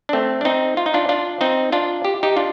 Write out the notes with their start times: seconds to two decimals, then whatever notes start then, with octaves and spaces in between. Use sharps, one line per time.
0.09 D4
0.13 A3 C4
0.41 D4
0.45 C4 D#4
0.77 F4
0.86 D#4
0.94 D4 F4
1.09 D4 F4
1.41 C4 D#4
1.72 D4 F4
2.05 G4
2.23 D#4 G4
2.37 D4 F4